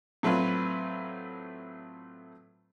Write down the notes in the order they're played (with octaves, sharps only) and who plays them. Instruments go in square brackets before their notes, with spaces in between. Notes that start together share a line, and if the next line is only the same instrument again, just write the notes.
[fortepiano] A2 F#3 A3 C4 F4 B4